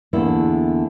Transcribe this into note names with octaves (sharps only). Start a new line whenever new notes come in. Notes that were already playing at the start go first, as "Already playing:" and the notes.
E2 D3 A#3 E4